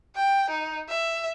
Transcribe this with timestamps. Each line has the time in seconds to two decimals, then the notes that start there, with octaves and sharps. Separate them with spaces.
0.16 G5
0.50 D#4
0.89 E5